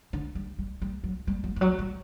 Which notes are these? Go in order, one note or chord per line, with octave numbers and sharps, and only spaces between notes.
D3
G3
G3
G3
F#3
G3
F#3
E3
F#3
G3